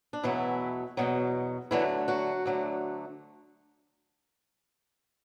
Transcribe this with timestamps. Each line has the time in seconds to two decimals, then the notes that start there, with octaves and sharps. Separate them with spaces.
0.13 D4
0.23 E2 B2 E3 F#3 A3 E4
0.97 E2 B2 F#3
1.71 D2 D3 E3 F#3 A3 E4
2.08 F#3 F#4
2.45 D2 D3 F#3 A3